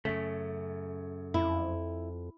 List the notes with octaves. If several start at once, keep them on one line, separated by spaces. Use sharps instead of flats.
F#2 C#3 A3
F2 E4